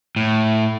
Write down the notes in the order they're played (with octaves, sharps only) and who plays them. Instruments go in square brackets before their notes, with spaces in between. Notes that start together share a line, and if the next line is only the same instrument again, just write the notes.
[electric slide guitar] A2